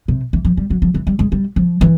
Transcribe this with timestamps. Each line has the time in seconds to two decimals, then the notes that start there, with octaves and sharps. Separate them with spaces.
0.08 C3
0.33 E3
0.45 F3
0.57 G3
0.70 F#3
0.82 F3
0.94 E3
1.07 G3
1.19 G#3
1.32 G3
1.56 F3
1.81 E3